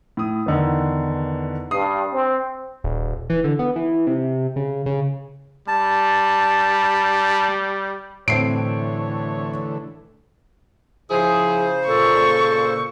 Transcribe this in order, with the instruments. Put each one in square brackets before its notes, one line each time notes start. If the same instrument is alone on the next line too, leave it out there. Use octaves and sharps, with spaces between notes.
[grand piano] A2 D#6
E2 D3 D#3
[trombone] G2 [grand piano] D#6 C7
[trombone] C4
[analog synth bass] D#1
E3
D3
B3
E3
C3
C#3
C#3
[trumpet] G3 [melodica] A5
[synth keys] A2 [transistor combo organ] D3 E3 A3 [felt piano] C4 C7 D7 [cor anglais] C#5
[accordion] C#3 C5 [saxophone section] F3 E4 G#4
[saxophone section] A#2 [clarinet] A4 [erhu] C#6